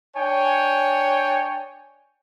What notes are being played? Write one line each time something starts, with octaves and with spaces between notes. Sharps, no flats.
D4 C#5 G5 G#5